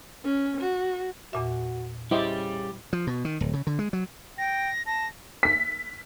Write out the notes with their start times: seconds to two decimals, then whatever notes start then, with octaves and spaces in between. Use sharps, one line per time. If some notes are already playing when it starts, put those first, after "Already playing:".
0.24 C#4
0.61 F#4
1.33 E2 A#2 F#4 E5
2.11 C#3 G3 E4 G4 C5 D#5
2.93 F3
3.07 B2
3.25 D#3
3.41 D1
3.54 C#3
3.67 D3
3.79 G#3
3.93 F#3
4.38 G5 A#6
4.86 A5 A#6
5.43 B6